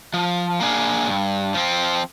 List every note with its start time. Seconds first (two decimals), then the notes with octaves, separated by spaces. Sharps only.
0.14 F3
0.60 A#3 D4 G#4
1.07 G2
1.54 F3 C4